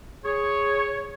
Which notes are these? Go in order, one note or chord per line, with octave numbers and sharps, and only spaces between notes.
G#4 C#5